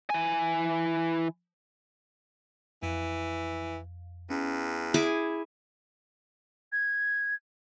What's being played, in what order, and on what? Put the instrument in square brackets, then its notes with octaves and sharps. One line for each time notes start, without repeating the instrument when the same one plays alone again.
[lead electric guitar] E3 G#5
[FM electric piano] F2 [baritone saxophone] E3
[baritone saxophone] E2 [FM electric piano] C#4
[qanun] E4 G#4 D6
[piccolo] G#6